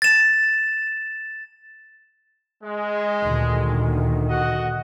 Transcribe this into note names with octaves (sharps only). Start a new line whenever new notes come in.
A6 E7
G#3
D2 A#2 D#3
F#4 D#5 F#5